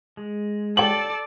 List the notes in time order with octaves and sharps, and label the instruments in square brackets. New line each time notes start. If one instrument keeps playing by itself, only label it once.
[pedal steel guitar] G#3
[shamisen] G4 C#5 G5 [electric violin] A4 D5 [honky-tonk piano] F#7